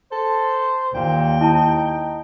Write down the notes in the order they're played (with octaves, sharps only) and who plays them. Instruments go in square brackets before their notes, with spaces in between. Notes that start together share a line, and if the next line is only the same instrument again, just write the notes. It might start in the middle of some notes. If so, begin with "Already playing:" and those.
[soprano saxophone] A4 [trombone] C5
[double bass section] D#2 [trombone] A#2 [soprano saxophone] G5
[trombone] D#4 [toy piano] E4 A5